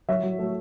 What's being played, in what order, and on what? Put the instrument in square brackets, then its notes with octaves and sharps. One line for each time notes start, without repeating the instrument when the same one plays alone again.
[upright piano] F#3 C#5 E5
F#3
A3